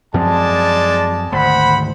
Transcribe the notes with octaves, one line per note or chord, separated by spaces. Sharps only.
F#2 F3 G#3 C4 D5 A5
G#1 D2 C5 F#5 B5